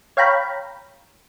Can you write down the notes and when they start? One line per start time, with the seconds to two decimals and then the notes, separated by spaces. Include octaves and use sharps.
0.17 C#5 F5 G5 A#5 B5